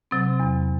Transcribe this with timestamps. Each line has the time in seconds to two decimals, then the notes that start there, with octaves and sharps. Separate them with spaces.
0.11 C3 F#3 C4
0.40 E2